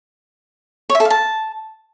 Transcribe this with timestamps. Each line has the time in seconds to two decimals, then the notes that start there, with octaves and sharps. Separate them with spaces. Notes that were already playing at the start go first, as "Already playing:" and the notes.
0.90 C#5
0.95 E5
1.00 A4
1.05 F5
1.10 A5